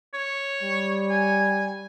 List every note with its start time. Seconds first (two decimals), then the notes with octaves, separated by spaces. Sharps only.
0.14 C#5
0.63 G3
1.10 G#5